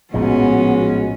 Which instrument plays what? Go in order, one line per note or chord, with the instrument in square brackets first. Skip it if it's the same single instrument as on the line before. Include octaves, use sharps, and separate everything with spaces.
[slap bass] A#1 A2 F3 [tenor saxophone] G#3 [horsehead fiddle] B3 F#4 [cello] C#4